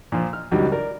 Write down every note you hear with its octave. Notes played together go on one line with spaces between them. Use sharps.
A#2 F3
F6
C#2 D#3 F#3 G3
A#4 D5